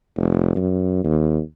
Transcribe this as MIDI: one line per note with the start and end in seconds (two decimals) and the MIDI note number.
0.17 0.53 29
0.56 1.00 42
1.04 1.39 39